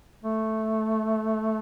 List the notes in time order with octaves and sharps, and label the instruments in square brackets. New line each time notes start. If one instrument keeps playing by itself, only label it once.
[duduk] A3